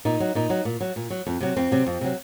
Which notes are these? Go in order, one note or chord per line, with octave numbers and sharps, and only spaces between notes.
A#2 D#4
F#3
A#2 D#4
F#3
A#2
F#3
A#2
F#3
F2
C3 F#3
F2 C4
C3 F#3
F2
C3 F#3